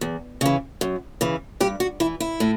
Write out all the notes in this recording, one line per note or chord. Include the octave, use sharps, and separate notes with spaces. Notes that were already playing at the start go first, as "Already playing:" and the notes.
E2
C#3 E3
F#2
C#3 E3
G2 G4
F#4
E3 E4
E4
A2